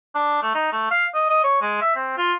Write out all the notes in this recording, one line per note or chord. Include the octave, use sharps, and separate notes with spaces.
D4
A3
D#4
A3
F5
D#5
D#5
C#5
G#3
E5
C4
F4